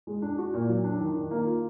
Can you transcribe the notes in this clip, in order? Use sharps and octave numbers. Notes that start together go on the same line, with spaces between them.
G#3
D4
F#4
A#2
F#3
D4
D#3
D#3
A#3
F4